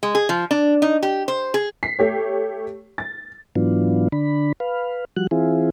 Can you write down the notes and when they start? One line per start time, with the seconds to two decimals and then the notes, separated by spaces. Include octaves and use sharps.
0.03 G#3
0.15 G#4
0.29 F3
0.51 D4
0.82 D#4
1.02 G4
1.28 C5
1.54 G#4
1.83 B6 C7
1.99 A3 G4 C#5
2.98 A6
3.56 G#2 E3 F#3 B3 D4 F4
4.12 D3 D4 B5
4.60 B4 F5
5.17 F3 G3 F#4 F#6
5.31 E3 C4 E4 F4 G#4